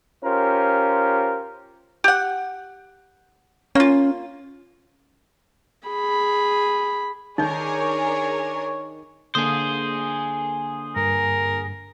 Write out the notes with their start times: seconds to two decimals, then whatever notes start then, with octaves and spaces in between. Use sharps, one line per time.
0.24 C#4 F4 G4 A#4 C5
2.04 G4 F#5
3.75 A#3 C#4 F4
5.88 G#4 B5
7.38 D#3 D4 D#4 G#4 A#4 C#5 G6
9.35 D3 A#3 D4 G#4 C5 D#6
10.96 G2 A#4